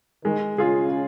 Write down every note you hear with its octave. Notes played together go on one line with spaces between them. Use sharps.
D#3 G#3
C#3 F4 G#4